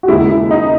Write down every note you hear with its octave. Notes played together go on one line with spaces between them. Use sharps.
F#4
D#2 C#3 G#3 E4
E4
D#4